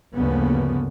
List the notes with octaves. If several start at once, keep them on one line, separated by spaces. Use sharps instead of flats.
D2 G2 C#3 F3 A#3 B3